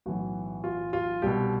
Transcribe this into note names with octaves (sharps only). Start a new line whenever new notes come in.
B1 A2 E3 F#4
F4
F4
C2 B2 G4